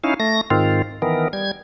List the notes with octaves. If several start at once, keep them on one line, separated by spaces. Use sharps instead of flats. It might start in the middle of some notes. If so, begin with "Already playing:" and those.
C#4 D#4 E4 F5
A3 A#6
G#2 D#3 C4 F4
D#3 E3 B3 A#4
G3 G#6